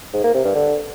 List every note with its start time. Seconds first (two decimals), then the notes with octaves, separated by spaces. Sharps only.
0.13 G#2
0.24 A#3
0.34 C3
0.45 G2
0.55 D3